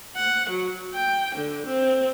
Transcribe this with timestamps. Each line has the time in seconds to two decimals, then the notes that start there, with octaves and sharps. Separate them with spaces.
0.16 F#5
0.49 F#3
0.94 G5
1.36 D3
1.67 C4